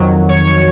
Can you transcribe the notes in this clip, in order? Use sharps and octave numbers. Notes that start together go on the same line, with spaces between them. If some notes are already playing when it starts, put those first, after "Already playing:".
Already playing: F2 D#3 F#3
C#5